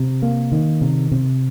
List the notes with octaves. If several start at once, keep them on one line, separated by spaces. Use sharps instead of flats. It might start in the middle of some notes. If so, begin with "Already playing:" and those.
Already playing: C3
A#3
D#3
C3
C3